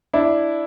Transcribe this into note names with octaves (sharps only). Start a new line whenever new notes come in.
D4 E4